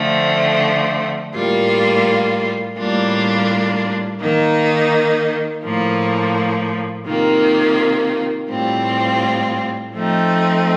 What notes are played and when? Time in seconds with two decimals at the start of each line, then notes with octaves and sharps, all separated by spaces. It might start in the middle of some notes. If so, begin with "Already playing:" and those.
Already playing: D3 F3 A3 C4
1.34 A2 G3 A#3 F4
2.77 A2 G3 A#3 D4 F4
4.20 D#3 A#3 D#4
5.63 A2 F3 A#3
7.07 C3 D#3 A#3 F4
8.49 A2 G3 C4 F4
9.92 F3 A3 C4 D#4